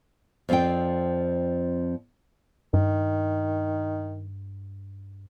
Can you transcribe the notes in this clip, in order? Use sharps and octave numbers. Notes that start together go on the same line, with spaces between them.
F2 F3 C4 D5 G5
G2 D#3